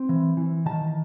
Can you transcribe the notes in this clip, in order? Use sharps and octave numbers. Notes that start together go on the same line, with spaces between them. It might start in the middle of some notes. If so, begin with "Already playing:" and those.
Already playing: C4
E3
E3
D#3 A5